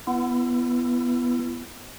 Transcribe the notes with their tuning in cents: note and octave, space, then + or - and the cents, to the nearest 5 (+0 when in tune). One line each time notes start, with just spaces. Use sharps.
B3 +0 E4 +40